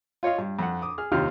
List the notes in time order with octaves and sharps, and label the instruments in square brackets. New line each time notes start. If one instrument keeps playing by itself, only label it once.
[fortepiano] F4 C#5 D#5 F5
G2
F2 F#5
D6 D#6
G#4 F6
D#2 C3 D#3 F4 F6